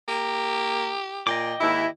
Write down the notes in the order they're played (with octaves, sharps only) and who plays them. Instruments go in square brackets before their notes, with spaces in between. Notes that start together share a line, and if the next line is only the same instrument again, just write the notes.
[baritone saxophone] A#3 [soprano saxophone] G4
[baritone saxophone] A#2 [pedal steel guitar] D#5 G5 D6
[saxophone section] D#2 E4 [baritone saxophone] G#2